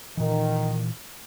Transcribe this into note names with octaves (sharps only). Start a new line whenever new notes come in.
A#2 D#3 E3